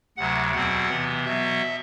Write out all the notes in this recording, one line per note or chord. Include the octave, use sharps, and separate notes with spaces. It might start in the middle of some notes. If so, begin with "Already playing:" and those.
D2 C3 F#3 F#5
E2 B2 F#3 C4 F#5
C3 E3 B3
B2 F#3 B3 E5